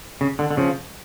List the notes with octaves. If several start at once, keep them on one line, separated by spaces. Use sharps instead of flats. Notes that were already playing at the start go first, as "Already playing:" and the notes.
C#3
D3
D3
C#3 F3